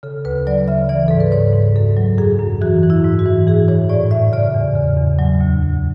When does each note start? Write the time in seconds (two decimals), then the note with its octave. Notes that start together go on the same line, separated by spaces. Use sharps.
0.03 C#3 A4
0.25 D2 B4
0.47 F#3 D5
0.68 C#3 E5
0.89 E3 D5
1.08 G#2 A4
1.20 B4
1.32 G#2 C#5
1.53 G#2
1.75 F#2 A4
1.96 F#3
2.18 F#2 G#4
2.40 F#2
2.62 E3 F#4
2.83 E3
2.90 E4
3.05 G#2
3.19 F#4
3.25 E3
3.47 E3 G#4
3.68 E3 C#5
3.89 A2 D5
4.11 A2 E5
4.33 C#3 D5
4.54 E2
4.75 C#3
4.97 E2
5.19 F#3
5.41 D2
5.63 D2